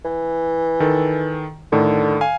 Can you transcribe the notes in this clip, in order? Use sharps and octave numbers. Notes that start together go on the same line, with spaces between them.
E3
D#3 A4
A2 D3 D#3
F5 G#5